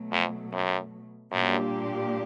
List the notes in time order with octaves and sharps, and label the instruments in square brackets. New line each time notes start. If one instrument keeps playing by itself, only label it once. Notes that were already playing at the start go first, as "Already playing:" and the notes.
Already playing: [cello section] B2 F#3 A3
[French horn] F2
F#2
[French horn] F#2 [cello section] A#2 G3 A#3 D4 G4